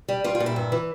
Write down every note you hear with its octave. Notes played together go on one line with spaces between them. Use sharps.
G3
G3 F4
F4
A#2
E4
G2
E3